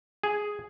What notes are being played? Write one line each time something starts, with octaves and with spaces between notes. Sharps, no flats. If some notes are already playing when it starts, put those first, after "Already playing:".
G#4